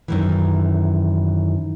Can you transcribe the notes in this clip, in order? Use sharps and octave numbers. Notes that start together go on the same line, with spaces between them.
F#2 D#3 E3